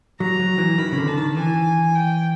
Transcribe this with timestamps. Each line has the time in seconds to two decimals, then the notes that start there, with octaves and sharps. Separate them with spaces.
0.20 F#3 A#5
0.39 F#3
0.58 E3
0.78 D#3 B5
0.92 C#3
0.97 D3
1.08 A5
1.18 D#3
1.37 E3 G#5
1.95 G5